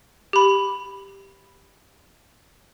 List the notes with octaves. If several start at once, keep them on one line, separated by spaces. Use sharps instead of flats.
G4 B5